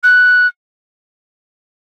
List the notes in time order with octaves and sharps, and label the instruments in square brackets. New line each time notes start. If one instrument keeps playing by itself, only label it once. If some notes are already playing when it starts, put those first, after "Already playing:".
[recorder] F#6